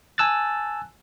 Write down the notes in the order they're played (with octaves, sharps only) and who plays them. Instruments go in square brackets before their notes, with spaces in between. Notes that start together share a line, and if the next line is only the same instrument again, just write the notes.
[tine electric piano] G#5 A5 E6 F#6 A6